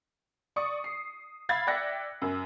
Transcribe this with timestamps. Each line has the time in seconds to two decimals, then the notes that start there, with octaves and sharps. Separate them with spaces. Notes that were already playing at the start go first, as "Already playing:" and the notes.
0.56 D5 C#6 D#6 C#7
0.84 C7
1.49 E5 F5 B5 G#6 A6
1.67 D5 E5 G5 F#6 A#6 C#7
2.22 F#2